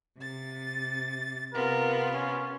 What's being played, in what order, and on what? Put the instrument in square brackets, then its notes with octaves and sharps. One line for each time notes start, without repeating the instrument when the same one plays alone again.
[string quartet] C3 A6
[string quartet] C3 B3 F4 [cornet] A#4
[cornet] C#4